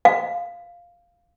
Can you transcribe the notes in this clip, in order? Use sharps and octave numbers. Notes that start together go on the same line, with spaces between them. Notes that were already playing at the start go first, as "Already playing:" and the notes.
F5